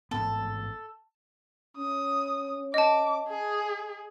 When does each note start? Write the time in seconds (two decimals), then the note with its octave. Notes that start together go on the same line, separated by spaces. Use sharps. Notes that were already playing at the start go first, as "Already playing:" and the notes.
0.11 A1 G#2 B3 A4
1.77 C#4 D#6
2.74 D#5 A5 D6
3.28 G#4